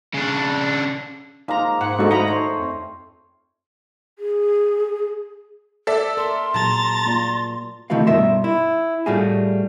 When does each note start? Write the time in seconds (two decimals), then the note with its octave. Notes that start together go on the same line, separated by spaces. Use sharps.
0.14 C#3 D4
1.48 F3 G#3 A#3 D#4 A#5
1.81 G#2 F#5
1.99 G#3 D4 D#4 F#4 A4
2.11 A3 D#5 A#5 B5 C#7
2.28 C5 C#5
2.59 F2
4.19 G#4
5.87 A4 D5 E5
6.17 A#4 C6
6.54 A#2 F#3 G#4 A5 A#5 A6
7.06 A#3 F4 D5
7.90 C3 D#3 A3 E4 F#4 F5
8.07 G2 B2 A#4 E5 C6
8.44 E4
9.06 A2 G3 A3 F4 F#4 G#4